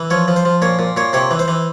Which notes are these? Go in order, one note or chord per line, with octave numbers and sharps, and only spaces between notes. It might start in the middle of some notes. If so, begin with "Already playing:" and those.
Already playing: E3
F3 C#5
F3
C5
F3
A#2 C#5
A#2
A#2 C#5
C3 C#5
E3
C5
E3